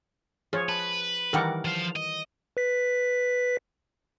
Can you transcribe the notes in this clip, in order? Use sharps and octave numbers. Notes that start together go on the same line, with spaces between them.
F3 G#4 C#5
B4 A5
D#3 E3 G3 A#4 F#5 D6
F3 F5
D#5
B4 B6